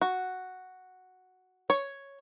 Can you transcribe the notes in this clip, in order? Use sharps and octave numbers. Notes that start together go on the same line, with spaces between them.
F#4
C#5